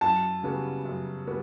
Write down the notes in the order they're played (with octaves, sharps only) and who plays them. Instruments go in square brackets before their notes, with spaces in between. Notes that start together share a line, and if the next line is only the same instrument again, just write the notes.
[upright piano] F#2 [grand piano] A5
[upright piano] C#3 G3 B3 F#4
F#2
G3 B3 F#4